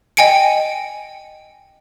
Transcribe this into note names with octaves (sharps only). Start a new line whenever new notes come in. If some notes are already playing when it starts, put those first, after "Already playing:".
D#5 G5 G#5 C#7 D7